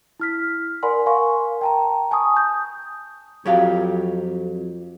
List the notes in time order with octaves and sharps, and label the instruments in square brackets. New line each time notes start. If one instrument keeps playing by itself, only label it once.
[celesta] E4 F6 B6
A#4 D5 F#5 G#5 B5 C6
A#4 F5 G#5 C6 C#6
G5 A5 A#5
G#5 A5 C#6 D#6
D#6 G6
[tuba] F2 [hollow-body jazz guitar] F#3 G4 F5